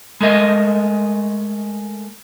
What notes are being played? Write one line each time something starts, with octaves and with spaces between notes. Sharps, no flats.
G#3 A3 A#4 D#5